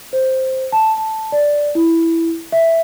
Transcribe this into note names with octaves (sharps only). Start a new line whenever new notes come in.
C5
A5
A5
D5
E4
E5